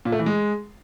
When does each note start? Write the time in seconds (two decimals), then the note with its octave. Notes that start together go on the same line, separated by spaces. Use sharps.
0.05 A#2
0.12 A3
0.19 E3
0.26 G#3